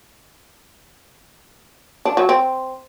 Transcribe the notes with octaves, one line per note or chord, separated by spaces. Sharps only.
D4
F#3
C4